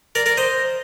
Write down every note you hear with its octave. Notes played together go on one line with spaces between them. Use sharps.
A#4 D5
A#4 D5
C5 D#5